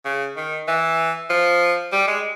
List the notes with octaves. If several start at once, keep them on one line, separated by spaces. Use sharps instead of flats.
C#3
D#3
E3
F3
G3
G#3